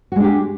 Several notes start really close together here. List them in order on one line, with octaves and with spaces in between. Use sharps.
F#4 G#3 D4 G4